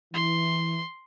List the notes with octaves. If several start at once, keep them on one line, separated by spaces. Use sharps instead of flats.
E3 C6